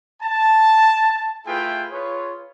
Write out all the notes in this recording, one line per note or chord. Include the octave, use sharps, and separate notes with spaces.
A5
A3 E4 F4 G#4 B4 G5
F4 G#4 B4 C#5